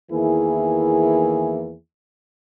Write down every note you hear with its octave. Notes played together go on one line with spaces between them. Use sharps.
E2 D#3 E3 A#3 E4 G#4